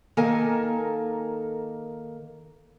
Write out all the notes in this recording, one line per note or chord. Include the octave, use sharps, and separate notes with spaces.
D#3 A#3 A4 A#4 G#5